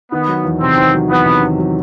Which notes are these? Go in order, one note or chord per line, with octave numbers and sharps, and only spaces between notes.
D#3 B3
F#3
E2
C3 C4
D#3
F#3
E2 B3
C3
D#3
F#3